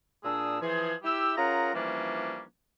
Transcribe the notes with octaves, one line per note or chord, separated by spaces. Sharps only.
A#2 D4 G#4 D#6 E6
E3 F3 G#4
E4 G4 E6
C#4 F4 G#4 A#4 F#5 A#5
E3 F3 G3 A#3 C#4 D4